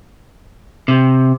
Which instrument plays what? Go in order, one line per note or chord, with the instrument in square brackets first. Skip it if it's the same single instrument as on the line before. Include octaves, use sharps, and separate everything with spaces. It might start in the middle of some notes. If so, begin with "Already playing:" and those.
[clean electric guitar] C3